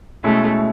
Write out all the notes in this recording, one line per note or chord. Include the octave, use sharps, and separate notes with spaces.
B2 G#3 A3 C#4 E4